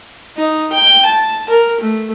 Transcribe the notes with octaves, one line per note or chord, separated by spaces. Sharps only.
D#4
G5
A5
A#4
A3